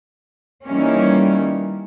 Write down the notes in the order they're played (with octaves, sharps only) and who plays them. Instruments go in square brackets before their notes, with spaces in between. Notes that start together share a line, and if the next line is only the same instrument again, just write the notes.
[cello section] D#3 E3 G3 A#3 C#4